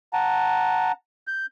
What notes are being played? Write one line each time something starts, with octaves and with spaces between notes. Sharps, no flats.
F#5 A5 A#5
G6